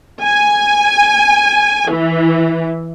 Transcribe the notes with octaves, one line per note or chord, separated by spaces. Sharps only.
G#5
E3